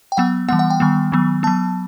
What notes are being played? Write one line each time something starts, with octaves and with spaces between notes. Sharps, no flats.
G5
F#3 B3 F#5
E3 G3 B3 F#5
F#5
G5
D#3 G3 B3
D#3 F#3 B3
F#3 B3 A5